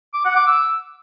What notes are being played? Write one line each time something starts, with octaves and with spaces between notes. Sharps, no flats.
D6
F#5
D6
E6